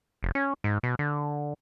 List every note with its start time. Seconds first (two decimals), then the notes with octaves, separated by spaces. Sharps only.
0.23 F1
0.35 C#4
0.64 G#2
0.83 B2
0.99 D3